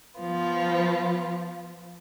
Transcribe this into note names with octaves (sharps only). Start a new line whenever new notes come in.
F3 B3 F4